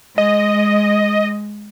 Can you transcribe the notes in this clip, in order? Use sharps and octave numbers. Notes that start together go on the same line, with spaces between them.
G#3 D#5